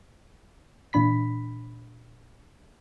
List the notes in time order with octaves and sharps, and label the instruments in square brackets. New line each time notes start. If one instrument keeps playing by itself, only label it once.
[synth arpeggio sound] A#2 E3 D4 B5 B6